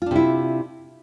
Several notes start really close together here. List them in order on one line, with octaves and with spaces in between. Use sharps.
F4 D4 C3 E4